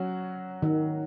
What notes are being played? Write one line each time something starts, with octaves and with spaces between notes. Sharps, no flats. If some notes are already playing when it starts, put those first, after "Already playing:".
Already playing: F#3 C#4 F#4
D#3